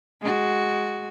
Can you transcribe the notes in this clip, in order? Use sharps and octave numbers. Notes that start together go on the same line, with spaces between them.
G#3 F#4